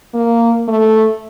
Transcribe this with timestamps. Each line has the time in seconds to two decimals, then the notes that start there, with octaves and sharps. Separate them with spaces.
0.14 A#3
0.68 A3